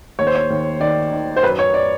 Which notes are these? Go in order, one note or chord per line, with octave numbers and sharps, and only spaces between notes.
D#2 C#5
C5
C#5
D#2
D#3 D5
D#3
C5
F#2 B4
C#5
D5